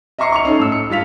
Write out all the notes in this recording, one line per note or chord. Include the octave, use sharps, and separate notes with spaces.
D#5 E5 A#5 C#6 C7 C#7
C#6 C#7 F7
C#4 D#4 A4
A2 E6
C#7
G2 F4 B6 F7